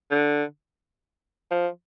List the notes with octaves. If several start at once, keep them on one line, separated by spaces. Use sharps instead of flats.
D3
F3